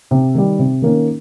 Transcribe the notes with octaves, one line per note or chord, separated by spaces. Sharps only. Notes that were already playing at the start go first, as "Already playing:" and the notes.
C3
D#3 G3
C3
D#3 A#3 C#4